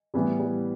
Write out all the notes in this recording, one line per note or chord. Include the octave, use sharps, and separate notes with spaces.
A2 E3 G3 B3
G3